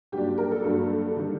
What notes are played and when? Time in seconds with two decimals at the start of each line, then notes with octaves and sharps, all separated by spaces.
0.12 G2 F#3 A#3 D4 G4
0.38 A#4
0.51 A4
0.64 G2 F#3 A#3 D4 A4
1.17 D#3 G3 D4